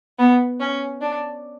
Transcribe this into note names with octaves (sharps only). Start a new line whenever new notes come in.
B3
C#4
D4